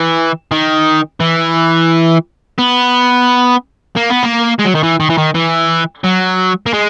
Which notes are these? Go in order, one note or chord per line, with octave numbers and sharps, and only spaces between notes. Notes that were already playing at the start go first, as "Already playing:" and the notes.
Already playing: E3
D#3
E3
B3
A#3
B3
A#3
G#3
F#3
D#3
E3
D#3
E3
D#3
E3
F#3
A#3
G#3